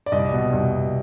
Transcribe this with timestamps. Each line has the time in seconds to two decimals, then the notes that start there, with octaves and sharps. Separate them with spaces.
0.06 D5
0.12 C2 D#5
0.32 B2
0.53 C2
0.72 B2